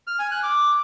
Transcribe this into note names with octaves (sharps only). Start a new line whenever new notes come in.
F6
G#5
F#6
D6